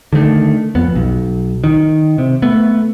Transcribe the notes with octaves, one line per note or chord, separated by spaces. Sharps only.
D3 D#3 A3
F2 B3
B1
D#3
C3
A3 B3